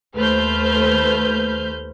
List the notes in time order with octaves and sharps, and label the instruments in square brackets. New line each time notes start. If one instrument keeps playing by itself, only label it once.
[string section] D#2 A3 B4 C5 F6 G6